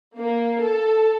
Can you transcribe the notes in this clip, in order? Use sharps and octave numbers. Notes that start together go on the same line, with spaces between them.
A#3
A4